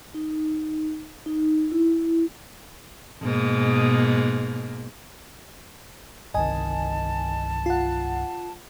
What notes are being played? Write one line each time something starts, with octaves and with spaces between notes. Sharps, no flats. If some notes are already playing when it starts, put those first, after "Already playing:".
D#4
D#4
E4
G#2 B2 A#3
G1 C2 D#3 D#5 G#5 A5
F4 F#5